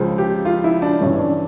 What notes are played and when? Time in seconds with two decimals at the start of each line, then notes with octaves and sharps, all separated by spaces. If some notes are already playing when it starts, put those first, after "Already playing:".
Already playing: C#2 C#3 F3
0.18 G4
0.45 F4
0.64 E4
0.82 D4
1.01 G1 G2 E3 C#4
1.19 D4